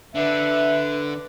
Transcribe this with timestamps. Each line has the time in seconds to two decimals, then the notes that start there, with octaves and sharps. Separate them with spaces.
0.15 D3 B4 E5